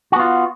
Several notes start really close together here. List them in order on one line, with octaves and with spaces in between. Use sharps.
F#4 B3 F4